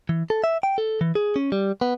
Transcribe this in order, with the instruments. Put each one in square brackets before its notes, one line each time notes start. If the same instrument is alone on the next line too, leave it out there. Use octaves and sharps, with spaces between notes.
[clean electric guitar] E3
A4
E5
G5
A4
E3
G#4
C#4
G3
B3